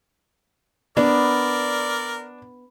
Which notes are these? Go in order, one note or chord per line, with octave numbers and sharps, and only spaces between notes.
B3 D4 A#4 D5